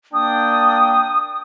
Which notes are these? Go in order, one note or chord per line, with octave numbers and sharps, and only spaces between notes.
A#3 D4 G5 D#6